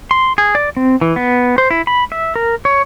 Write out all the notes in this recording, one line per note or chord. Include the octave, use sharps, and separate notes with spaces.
C6
G#4
D5
C4
E3
B3
C5
E4
B5
E5
A#4
C#5